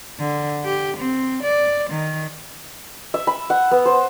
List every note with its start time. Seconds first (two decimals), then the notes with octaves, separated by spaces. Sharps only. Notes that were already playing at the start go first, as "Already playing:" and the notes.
0.20 D3
0.64 G4
0.97 C4
1.43 D5
1.90 D#3
3.14 E5
3.27 B5
3.50 F#5
3.71 B3
3.86 C5